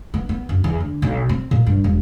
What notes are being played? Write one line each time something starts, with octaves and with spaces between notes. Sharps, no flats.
B3
B3
F#2
E2
D3
B1
C4
A#2
G2
E1